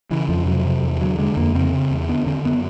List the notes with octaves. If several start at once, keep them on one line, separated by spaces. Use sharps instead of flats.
C#3 E3
F2 F3
C3 F#3
C3
E2
D3 F#3
D3 G#3
F2 A#3
C#3 C4
C#3
E2
D3 B3
D3 C4
F#2 B3